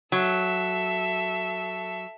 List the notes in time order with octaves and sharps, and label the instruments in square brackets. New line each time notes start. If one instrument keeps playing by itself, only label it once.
[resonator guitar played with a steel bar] F#3 [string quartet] A4 E5